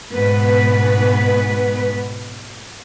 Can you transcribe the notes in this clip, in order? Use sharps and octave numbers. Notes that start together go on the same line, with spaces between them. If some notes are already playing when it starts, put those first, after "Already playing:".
G#2 B2 B3 B4